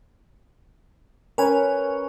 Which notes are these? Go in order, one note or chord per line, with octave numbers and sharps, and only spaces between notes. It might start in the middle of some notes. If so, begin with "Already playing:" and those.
C#4 A#4 B4 G#5